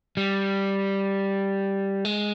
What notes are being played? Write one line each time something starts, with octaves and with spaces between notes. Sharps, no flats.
G3
G#3